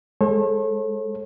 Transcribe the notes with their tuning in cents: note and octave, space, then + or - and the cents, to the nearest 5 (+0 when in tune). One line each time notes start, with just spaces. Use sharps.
G#3 +0 A4 +0 C#5 -45